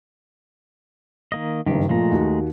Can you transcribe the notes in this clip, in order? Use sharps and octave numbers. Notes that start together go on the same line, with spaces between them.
D#3 A#3 D#5
F#1 G2 D#3 G4
A#2 F3 G#3 A3 A#5
D#2 F#4